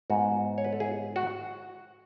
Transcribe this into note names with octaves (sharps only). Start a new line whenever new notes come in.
G#2 G#3 B3 F#4
C#5
B4
A4
E4 G#4
F#4